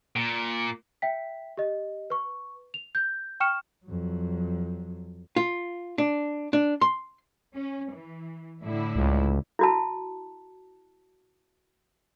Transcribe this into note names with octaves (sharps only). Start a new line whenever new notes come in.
A#2
E5 G5 B6
G4 D#5
B4 C#6
F7
G6
G5 C#6 F6 C#7 E7
F2 F#3
F4
D4
D4
C6
C#4
E3
A2 D3 E4
C#2
E4 F#4 A5